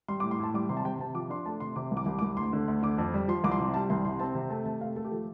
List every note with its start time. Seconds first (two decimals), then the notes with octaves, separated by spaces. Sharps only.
0.08 G3 C6
0.20 D6
0.24 A2
0.31 C6
0.39 A2 A5
0.54 G3 D6
0.69 C3 C6
0.77 A5
0.85 C3 G5
0.99 C3 A5
1.15 F3 D6
1.30 D4 C6
1.46 A3 A5
1.60 C3 C6
1.76 C3 D6
1.91 C2
1.97 D6
2.06 C2
2.19 D6
2.22 C2
2.37 D2 C6
2.53 D3
2.68 D2
2.82 D3 D6
2.98 F2
3.14 G3
3.28 F3 C6
3.44 C2 D6
3.51 C6
3.60 C3
3.74 G3 A5
3.90 C2 C6
4.05 C3 C6
4.19 C4 A5
4.35 C3
4.50 A3 A5
4.66 C3 A5
4.81 A3 F5
4.96 A3 A4
5.05 G4
5.11 F3 A4